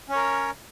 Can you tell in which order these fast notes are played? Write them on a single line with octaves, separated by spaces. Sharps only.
C#4 C#5 A#4